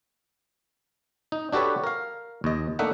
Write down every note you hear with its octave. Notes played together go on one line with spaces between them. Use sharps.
D#4
D4 F#4 G4 A4 B4 C#5
A#4 F5
D#2 D#5
A3 A#3 D4 D#4 E5 F#5